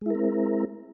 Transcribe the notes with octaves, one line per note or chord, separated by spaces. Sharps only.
G#3 C4 E4 A#4